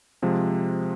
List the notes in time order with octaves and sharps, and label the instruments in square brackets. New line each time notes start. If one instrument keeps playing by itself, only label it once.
[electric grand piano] C3 F3 G#3